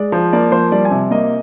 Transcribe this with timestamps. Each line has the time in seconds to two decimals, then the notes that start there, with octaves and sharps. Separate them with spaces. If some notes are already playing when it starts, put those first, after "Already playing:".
Already playing: G#3 D5
0.12 F3
0.33 A#3 D5
0.52 F3 C5
0.72 G3 D5
0.85 G#5
0.91 C3
1.11 A#3 D#5